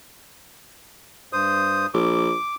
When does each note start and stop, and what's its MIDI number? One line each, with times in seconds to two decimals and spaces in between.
1.33 1.86 43
1.33 1.86 72
1.33 1.86 87
1.94 2.33 34
1.94 2.55 86